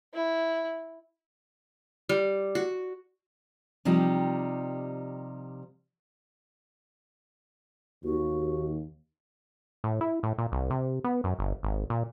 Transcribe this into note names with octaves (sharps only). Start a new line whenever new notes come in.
E4
G3
F#4
C3 F3 G3 D#4 G4
D#2 F#4
A2
E4
A2
A#2
C2
C3
B3
F#2
G1
G#1
A#2